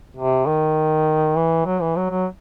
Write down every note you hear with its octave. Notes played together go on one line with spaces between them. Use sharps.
C3
D#3
E3
F#3
E3
F#3
F#3